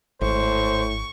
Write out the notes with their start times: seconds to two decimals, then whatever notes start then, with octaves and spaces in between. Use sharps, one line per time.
0.22 G#1 A2 C5 C#6